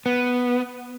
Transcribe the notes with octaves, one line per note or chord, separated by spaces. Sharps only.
B3